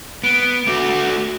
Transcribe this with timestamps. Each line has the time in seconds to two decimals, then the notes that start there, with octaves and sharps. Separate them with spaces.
0.23 B3 D7
0.67 A3 F#4 D6